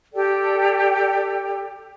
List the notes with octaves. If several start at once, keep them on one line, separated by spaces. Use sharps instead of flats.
G4 A4 D5 G5